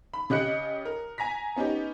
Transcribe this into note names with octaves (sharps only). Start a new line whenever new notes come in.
B5
C#3 G4 D#5 F#6 C#7
A#4
G#5 A#5 A#6 B6
B3 C#4 D#4 G4